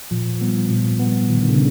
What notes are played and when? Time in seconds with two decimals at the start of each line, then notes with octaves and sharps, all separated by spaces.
0.11 A#2 F3
0.41 G3 B3
0.70 A#2
0.99 B3
1.05 G3
1.29 A#2 D#3
1.39 D3
1.49 C#3